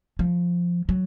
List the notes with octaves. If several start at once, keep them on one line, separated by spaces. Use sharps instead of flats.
F3
F#3